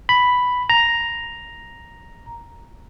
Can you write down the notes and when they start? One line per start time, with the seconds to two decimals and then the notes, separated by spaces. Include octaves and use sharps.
0.09 B5
0.70 A#5